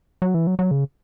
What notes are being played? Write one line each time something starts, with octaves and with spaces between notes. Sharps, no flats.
F#3
E3
F#3
F#3
C#3